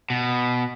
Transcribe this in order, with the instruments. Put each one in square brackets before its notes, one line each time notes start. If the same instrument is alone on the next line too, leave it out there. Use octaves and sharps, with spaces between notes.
[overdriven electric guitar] B2